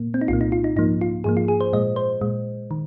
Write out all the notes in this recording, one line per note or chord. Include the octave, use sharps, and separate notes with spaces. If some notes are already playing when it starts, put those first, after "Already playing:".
Already playing: A#2 A#3
C4
D#4
C2 A#2 A#3 F4
D#4
F4
D#4
G#2 F3 A#3 D#4
F4
G#2 F3 A#3 G#4
F4
G#4
C5
A#2 G#3 D#5
C5
A#2 G#3
D#3